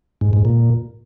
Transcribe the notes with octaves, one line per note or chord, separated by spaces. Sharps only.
G#2
G#2
A#2